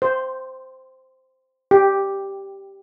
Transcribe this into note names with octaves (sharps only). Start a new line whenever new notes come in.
C5
G4